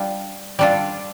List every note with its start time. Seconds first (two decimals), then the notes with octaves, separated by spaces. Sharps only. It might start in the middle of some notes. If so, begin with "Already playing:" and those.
Already playing: G3 D4 F4
0.59 G3 D4 F4 A4